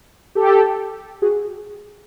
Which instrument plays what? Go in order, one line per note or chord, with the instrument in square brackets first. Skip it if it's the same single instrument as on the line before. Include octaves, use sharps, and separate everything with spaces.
[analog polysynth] G4 A4
F#4 G#4